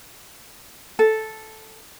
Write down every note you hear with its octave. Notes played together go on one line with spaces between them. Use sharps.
A4